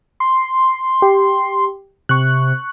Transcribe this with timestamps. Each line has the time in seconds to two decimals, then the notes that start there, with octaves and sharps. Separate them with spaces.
0.20 C6
1.02 G4
2.09 C3 C#6 F#6